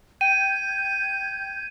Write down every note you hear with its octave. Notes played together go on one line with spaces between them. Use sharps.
G5 G6 G#6 D#7